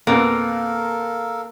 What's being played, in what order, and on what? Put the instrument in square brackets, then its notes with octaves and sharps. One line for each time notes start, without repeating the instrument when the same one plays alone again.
[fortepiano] F2 B2 C4 [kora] A#3 [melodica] A4 A#4 F5